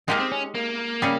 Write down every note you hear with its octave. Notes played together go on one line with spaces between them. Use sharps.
G#3 A#3 D#4 G4 A#4
C4
C#4
A#3
C#3 G3 C#4 G#4